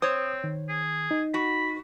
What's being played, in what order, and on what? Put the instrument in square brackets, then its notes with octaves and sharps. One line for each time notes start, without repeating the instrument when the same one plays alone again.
[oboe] C4 [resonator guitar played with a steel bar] C5 C#5 [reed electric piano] D#6
[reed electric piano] D#3
[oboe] G#4
[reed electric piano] D#4
[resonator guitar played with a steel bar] F#4 [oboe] B5